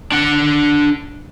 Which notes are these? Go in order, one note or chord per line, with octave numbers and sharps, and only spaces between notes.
D4 F#5